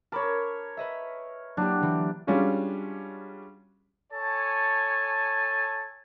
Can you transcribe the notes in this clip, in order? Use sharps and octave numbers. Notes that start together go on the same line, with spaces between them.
A#4 C#5 A5 B5 D6
B4 D#5 E5
F#3 A#3 D4 E4 G4
D3 E3
G3 G#3 C#4 D4 F4 F#4
A4 C#5 G#5 A5